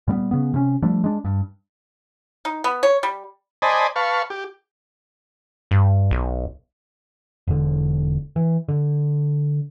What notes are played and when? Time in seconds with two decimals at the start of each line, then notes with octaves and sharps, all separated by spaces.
0.08 A#2 G3 A#3 B3
0.31 C#3 B3
0.54 C3 C#4
0.82 F3 G3 A3 D4
1.04 G#3 D4
1.25 G2
2.45 D#4
2.64 B3
2.83 C#5
3.03 G3
3.62 C5 D5 D#5 G#5 A5 B5
3.96 B4 F5 A5 C#6
4.30 G4
5.71 G2
6.11 B1
7.47 E1 D3
8.36 E3
8.69 D3